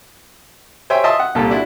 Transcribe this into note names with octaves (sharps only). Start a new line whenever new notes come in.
C5 C#5 E5 G5 G#5
F4 D#5 E5 A5 C6 D#6
F#5
C2 A#2 F4 G4 A4 A5
D4 E4 F#4